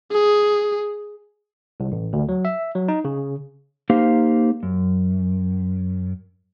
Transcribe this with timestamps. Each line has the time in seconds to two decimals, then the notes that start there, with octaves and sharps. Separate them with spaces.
0.12 G#4
1.80 C2
1.92 A1
2.13 D2
2.29 F#3
2.45 E5
2.75 F#3
2.88 D#4
3.05 C#3
3.90 A#3 D#4 G4 C5 F5
4.63 F#2